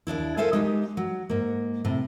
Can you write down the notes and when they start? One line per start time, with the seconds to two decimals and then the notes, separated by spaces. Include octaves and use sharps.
0.07 D#2 G#2 D4 E4
0.37 A4 A#4 C5 E5 F5 G#5
0.53 G#3 D#4 G4
0.97 F#3
1.30 G#2 A#3
1.85 A2 C3